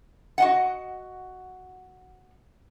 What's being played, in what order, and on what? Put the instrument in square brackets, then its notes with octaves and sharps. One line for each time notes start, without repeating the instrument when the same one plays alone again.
[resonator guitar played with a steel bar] F#4 D#5 F#5